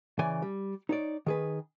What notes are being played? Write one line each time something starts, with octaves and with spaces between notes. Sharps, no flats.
C#3 E3 D5 G#5
G3
D#4 C#5 D5
D#3 G#4 B4